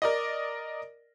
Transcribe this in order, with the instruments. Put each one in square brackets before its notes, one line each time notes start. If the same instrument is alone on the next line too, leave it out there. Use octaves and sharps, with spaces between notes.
[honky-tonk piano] A#4 D5 D#5